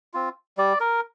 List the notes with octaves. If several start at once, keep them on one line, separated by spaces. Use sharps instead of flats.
C4 F4
G3 D5
A#4